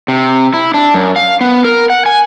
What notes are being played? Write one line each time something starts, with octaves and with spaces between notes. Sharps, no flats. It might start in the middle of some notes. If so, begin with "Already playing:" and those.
C3
E4
D4
F#2
F5
B3
A#4
F#5
G#5